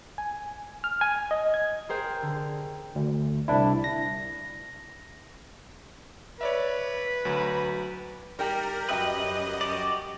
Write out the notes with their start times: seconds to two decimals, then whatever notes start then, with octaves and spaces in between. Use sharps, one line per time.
0.18 G#5
0.84 F6
1.01 G#5
1.31 D#5
1.54 G#6
1.89 G#4 A#4 C5 G5
2.22 D3
2.95 D2
3.48 C2 D4 E4
3.84 A#6
6.41 B4 C#5 D5 E5
7.25 D2 F#3
8.39 G3 D#4 G4 A#4
8.89 F#2 A#4 B4 D#5 E5 G5
9.61 F#4 G4 D5